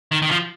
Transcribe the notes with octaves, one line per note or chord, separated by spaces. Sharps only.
D#3
D#3
F3